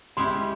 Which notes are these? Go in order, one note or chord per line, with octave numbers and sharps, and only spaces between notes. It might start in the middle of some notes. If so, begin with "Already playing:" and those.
G#3 C#4 E4 G4 C6